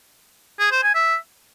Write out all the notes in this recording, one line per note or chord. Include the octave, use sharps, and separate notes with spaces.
G#4
C5
G#5
E5